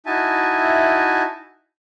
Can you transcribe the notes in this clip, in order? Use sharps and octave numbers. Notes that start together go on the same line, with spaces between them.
D#4 E4 F#4 E5 G#5 A5